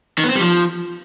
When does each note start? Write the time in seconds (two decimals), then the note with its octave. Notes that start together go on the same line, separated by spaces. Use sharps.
0.18 D#3
0.24 B3
0.29 C4
0.35 G3
0.41 F3